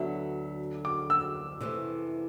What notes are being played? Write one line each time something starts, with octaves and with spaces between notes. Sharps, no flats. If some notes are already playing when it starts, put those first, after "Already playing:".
Already playing: D2 D3 F#3 B3 E5
D6
E6
C3 E3 A3